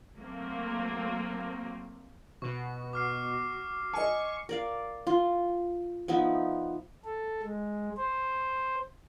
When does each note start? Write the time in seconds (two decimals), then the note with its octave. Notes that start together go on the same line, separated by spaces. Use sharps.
0.17 F#3 A3 A#3 C4
2.42 B2 F#4 C#6
2.93 D6 F6 C7
3.93 D#5 G#5 C#6
4.49 A#4 D5 F5
5.07 F4
6.08 F3 B3 D#4 E5
7.05 A4
7.43 G#3
7.97 C5